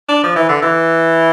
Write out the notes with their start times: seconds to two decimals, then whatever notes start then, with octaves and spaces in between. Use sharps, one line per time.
0.09 D4
0.23 F3
0.36 E3
0.49 D3
0.62 E3